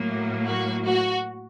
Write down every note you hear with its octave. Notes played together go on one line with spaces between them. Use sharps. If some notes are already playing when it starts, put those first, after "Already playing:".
Already playing: A2 F#3 A#3
F#4
F#4